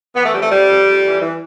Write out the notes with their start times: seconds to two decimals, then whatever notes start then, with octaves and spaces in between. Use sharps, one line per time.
0.16 E3 B3
0.25 A3
0.34 F2 G3
0.42 A3
0.51 F2 G3
0.70 F2
0.86 F2
1.05 E3
1.21 E3